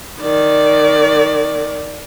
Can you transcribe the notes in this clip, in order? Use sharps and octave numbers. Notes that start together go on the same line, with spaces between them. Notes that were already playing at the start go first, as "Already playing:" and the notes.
D#3 D5